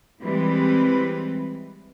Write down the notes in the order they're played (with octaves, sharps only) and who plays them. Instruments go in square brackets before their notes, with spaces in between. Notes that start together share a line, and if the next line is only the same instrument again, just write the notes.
[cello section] E3 G3 G#3 C4 B4